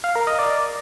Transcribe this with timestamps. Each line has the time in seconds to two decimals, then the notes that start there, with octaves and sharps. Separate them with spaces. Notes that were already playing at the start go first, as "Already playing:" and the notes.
0.04 F5
0.15 A#4
0.27 D#5
0.39 D5